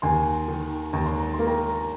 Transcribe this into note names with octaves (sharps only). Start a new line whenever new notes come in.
D#2 G#5 C6
D#3
D#2 A#5
C6
A#5
C6
A#3
G5 A#5